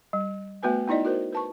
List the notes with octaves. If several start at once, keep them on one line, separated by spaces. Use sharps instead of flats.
G3
A3 B3 F#4 B4 G#5
B3 D#4 E4 D5 D#5
F#4 A#4 C5
B4 A5 C#6